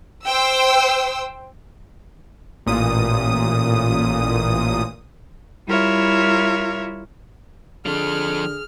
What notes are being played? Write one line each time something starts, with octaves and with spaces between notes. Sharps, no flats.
C5 G5 E6
A1 A#2 D#6
G3 E4 F4 A#4 C#5 E5
D3 F3 G#4 A4 F6